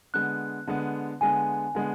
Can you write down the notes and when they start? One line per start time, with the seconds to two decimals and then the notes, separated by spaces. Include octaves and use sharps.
0.14 D3 G#3 B3 F#6
0.67 D3 G#3 B3
1.21 D3 G#3 B3 G#5
1.75 D3 G#3 B3